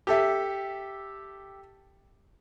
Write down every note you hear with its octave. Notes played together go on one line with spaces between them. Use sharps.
G4 A4 E5